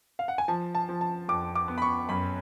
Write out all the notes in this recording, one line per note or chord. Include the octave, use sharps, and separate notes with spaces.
F5
F#5
G#5
F3 A5
A5
F3
A5
F2 D6
D6
B3
B5
C#6
F#2 B5